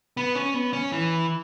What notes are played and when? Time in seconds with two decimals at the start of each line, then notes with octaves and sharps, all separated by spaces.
0.17 B3
0.35 C#4
0.54 B3
0.73 C#4
0.92 E3